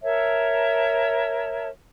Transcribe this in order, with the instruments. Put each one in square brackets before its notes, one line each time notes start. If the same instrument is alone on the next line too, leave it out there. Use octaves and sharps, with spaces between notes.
[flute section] A#4 C#5 E5 A5